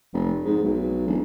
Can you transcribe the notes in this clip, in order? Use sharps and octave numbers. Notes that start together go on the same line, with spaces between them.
F1
G#2
B1
E1